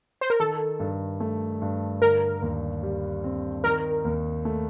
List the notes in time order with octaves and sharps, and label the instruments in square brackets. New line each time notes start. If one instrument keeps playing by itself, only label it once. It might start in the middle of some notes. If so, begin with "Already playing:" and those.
[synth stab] C5
A#4
[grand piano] D#3 [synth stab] A4
[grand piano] G2
A3
G2
[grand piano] D3 [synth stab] A#4
[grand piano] D#2
G3
C4
[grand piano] D#3 [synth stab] A#4
[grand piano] D#2
A3